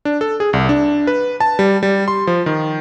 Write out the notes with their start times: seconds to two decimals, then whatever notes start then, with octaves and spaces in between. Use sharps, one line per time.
0.05 D4
0.21 A4
0.40 G#4
0.53 C2
0.69 D4
1.07 B4
1.40 A5
1.59 G3
1.83 G3
2.08 C6
2.27 F3
2.46 D#3